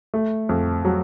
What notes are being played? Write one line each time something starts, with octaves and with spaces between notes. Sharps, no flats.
A3
F2
F#3